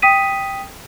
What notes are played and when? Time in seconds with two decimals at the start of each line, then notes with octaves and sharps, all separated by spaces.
0.02 G5 D#6 B6 D#7